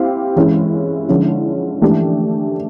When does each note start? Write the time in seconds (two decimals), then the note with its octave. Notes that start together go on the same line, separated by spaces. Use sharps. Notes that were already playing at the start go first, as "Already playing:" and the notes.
Already playing: C4 E4 G4 C5 F5
0.36 E3 G#3 C#4 E4
1.09 D3 F3 G#3 C#4 E4
1.81 E3 A3 D4 G4